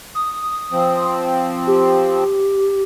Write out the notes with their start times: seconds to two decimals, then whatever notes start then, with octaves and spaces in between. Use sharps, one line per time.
0.15 D#6
0.72 F3 C4
1.67 G4